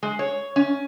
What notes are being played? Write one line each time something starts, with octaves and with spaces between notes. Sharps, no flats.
G#3
C#5
C#4